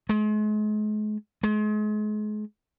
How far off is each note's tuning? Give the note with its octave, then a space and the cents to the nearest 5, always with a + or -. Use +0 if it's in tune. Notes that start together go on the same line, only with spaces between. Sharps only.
G#3 +40
G#3 +35